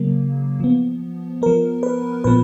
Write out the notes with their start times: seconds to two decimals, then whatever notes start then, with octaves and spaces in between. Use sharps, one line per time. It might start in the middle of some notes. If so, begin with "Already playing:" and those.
Already playing: C#3 F#3 A#3
0.60 F3 B3
1.42 F3 B3 A#4
1.83 B4
2.24 A#2 F3 B3 B4